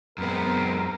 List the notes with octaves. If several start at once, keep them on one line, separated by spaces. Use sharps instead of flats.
F#2 G#3 B3 C4 A#4